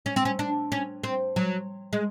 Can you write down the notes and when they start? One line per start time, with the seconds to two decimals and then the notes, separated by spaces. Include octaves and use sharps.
0.06 C#4
0.16 C4
0.25 C#4
0.39 D4
0.72 C#4
1.04 C4
1.36 F#3
1.93 G#3